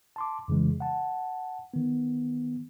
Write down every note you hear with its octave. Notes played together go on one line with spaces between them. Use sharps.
A5 C6 D6
F2 C#3 E3 G#3
F#5 A5
D#3 B3